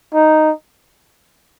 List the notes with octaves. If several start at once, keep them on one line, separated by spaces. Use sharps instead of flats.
D#4